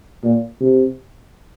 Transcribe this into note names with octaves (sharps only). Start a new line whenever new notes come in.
A#2
C3